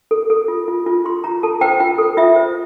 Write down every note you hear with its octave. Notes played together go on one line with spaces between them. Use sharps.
A4
A4
F4
F4
F4
F4 C6
F4 A#5
A4 A5
C5 G5
F4 G5
A4
F4 E5
C5